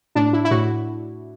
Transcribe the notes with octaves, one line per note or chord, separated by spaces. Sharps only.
A2 D4
E4
E4
A2 F#4